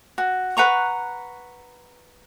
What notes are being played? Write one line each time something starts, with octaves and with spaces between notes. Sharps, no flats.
F#4
B4 F#5 A#5 C#6